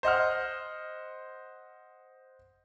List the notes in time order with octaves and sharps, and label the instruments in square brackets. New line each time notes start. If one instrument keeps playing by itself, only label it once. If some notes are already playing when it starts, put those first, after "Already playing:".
[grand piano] C5 D#5 F#5 F6